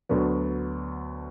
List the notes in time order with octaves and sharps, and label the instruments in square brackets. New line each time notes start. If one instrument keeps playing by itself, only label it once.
[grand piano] D2 D3 F#3 B3